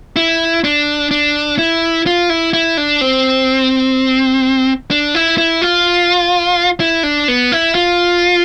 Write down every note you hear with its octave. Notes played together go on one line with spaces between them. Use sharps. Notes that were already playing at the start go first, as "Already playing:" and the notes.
E4
D4
D4
E4
F4
E4
E4
D4
C4
D4
E4
E4
F4
E4
D4
B3
E4
F4